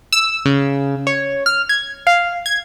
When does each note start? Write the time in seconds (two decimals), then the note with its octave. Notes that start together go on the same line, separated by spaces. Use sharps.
0.13 E6
0.46 C#3
1.07 C#5
1.46 F6
1.69 G#6
2.07 F5
2.46 G#6